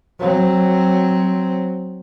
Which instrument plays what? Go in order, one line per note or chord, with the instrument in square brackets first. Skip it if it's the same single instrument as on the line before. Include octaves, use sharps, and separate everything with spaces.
[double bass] F#3 C4